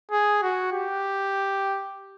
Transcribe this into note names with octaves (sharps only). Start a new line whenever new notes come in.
G#4
F#4
G4